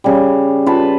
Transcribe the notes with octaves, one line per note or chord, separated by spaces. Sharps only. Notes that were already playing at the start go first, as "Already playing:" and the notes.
C#3 G3
F4 B4 A5